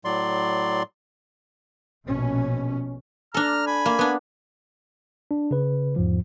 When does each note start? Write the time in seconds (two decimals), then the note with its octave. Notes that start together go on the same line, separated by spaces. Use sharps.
0.05 A2 F#3 D5 C6
2.07 A#1 B2 C#4
3.34 D4 A4 A#5 F6
3.67 G#5 B5
3.86 A#3
3.99 B3 D4
5.31 D4
5.51 C#3 B4
5.96 E2 G#2 F3